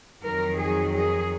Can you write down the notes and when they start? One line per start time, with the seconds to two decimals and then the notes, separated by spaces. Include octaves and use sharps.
0.24 F2 D#3 F#3 A#4
0.58 G#4
0.92 G#4